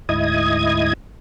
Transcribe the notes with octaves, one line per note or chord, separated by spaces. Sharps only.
D2 G#2 E4 D#5 D#6 G#6